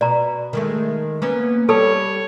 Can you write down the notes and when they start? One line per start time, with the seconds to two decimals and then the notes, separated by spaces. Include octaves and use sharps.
0.01 B2 D5 A#5
0.53 D#3 G#3 A3
1.22 A#3 B3 C#4
1.69 G3 A4 C#5 A5 E6